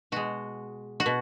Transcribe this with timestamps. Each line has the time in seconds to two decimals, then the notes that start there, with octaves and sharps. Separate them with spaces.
0.12 B2 G#3 F#4
1.00 F#4
1.06 B2